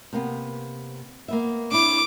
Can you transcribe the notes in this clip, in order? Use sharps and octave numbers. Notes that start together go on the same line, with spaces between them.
C3 A#3 B3
A#3 B3 E5
D4 E4 D6